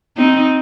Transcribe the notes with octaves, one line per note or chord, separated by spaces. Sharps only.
C4 D#4